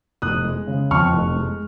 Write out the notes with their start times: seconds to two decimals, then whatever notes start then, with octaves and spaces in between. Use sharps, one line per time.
0.22 F1 D#6 F#6
0.45 G#3
0.67 C#3
0.91 F2 C#6 F6
1.13 F1
1.36 G#3